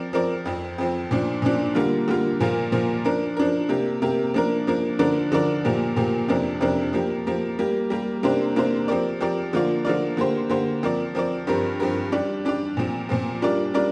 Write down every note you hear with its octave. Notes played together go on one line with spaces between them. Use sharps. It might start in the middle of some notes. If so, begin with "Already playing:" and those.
Already playing: F3 C4 A#4 D5
F3 C4 A#4 D5
F2 F3 C4
F2 F3 C4
A#2 F3 D4
A#2 F3 D4
D3 G3 A#3 F4
D3 G3 A#3 F4
A#2 F3 A#3 F4
A#2 F3 A#3 F4
F3 D4 A#4
F3 D4 A#4
C3 A#3 G4
C3 A#3 G4
F3 A#3 D4 A#4
F3 A#3 D4 A#4
D3 F3 D4 A#4 D5
D3 F3 D4 A#4 D5
A#2 F3 A#3 G4
A#2 F3 A#3 G4
F2 C3 F3 D4 A#4
F2 C3 F3 D4 A#4
F3 A#3 G4
F3 A#3 G4
G3 A#3 G4
G3 A#3 G4
C3 A#3 D4 G4 C5
C3 A#3 D4 G4 C5
F3 C4 G4 A#4 D5
F3 C4 G4 A#4 D5
D3 F3 A#3 F4 D5
D3 F3 A#3 F4 D5
D3 A#3 G4 C5
D3 A#3 G4 C5
F3 C4 A#4 D5
F3 C4 A#4 D5
G2 F3 C4 G4 A#4
G2 F3 C4 G4 A#4
G3 D4 G4 D5
G3 D4 G4 D5
A#2 F3 C4
A#2 F3 C4
G3 D4 F4 A#4 D5
G3 D4 F4 A#4 D5